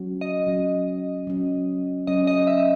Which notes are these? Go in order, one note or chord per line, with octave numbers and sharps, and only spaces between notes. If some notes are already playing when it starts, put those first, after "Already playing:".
Already playing: F#3 C#4 F#4
D#5
F#3 C#4 F#4
F#3 C#4 F#4
F#3 C#4 F#4 D#5
D#5
E5